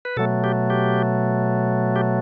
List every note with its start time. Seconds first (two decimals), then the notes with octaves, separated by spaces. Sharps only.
0.05 B4
0.17 B2 F#3 A3 A4
0.44 G4
0.70 G4
1.96 G4